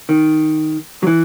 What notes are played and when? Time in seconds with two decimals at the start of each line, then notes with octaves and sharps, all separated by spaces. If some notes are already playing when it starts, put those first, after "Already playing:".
0.09 D#3
1.03 F#3
1.07 E3